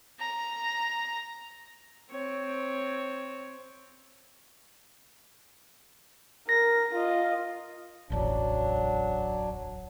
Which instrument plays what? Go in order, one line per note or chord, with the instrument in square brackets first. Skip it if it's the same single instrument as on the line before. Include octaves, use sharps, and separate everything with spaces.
[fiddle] A#5
[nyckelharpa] C4 C#5
[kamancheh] A#4 [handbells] A#6
[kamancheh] F4 D#5
[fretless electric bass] D1 A1 E2 [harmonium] F#3 D4